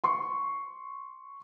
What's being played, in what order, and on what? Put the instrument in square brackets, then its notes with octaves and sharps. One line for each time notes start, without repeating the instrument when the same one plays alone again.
[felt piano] C6 C#6